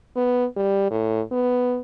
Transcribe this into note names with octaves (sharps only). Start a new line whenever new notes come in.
B3
G3
A2
B3